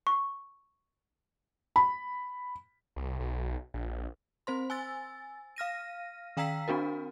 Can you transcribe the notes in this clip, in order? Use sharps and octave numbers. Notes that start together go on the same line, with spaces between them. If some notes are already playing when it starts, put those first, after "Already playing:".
C#6
B5
C2
B1
A#1
C4 C5 C6
G#5 E6 A6
F5 F6 A#6 D#7
D#3 F5 G5 A#5 E6 B6
C4 D4 F#4 A#4